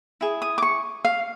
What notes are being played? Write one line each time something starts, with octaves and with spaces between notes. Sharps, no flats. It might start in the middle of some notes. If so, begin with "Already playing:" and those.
E4 G#4
D#6
D6
C#6
F5